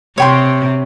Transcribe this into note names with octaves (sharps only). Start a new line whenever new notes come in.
C3 C#5 G5 C6